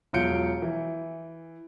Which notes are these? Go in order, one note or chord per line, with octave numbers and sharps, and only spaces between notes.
E1 F#3 F4 G6 C#7 D7
E3